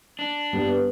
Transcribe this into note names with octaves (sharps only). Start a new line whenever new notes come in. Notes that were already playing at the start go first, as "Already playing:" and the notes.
D4
G2 B3